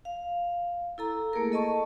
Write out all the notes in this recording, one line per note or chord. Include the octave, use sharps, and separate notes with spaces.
F5
E4 A4 A#5
A3 A#3 G#4 A#4
A4 D#5 A5 C#6